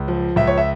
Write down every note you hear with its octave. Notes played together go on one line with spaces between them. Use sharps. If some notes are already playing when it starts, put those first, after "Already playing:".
Already playing: C#2
F3
C#2 E5
C#5
E5